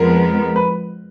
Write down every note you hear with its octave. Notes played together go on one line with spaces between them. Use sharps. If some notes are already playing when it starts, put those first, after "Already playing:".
Already playing: F2 F3 G#3 B3 A#4
B4